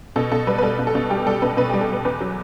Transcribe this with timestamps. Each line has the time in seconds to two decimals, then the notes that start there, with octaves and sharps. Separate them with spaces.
0.16 B2 A4
0.31 B2 A4
0.47 G3 B4
0.58 B4
0.62 G3 A4
0.79 B2
0.87 A4
0.95 B2
1.10 G3 G4
1.26 G3 A4
1.42 B2 B4
1.57 B2 B4
1.69 G3 G4
1.81 A4
1.90 G3 B4
2.05 E2 B4
2.21 F#3